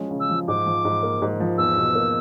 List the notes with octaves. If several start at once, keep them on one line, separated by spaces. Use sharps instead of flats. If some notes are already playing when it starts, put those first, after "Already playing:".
Already playing: F3 G#3 C#4
C#3
E6
F3
G#2 D6
F3
G#2
A#3
G#2
F3
E2 E6
B2
A#3